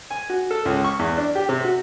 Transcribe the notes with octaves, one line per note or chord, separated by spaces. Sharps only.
G#5
F#4
A4
C#2
C#6
E2
D4
G4
C3
F#4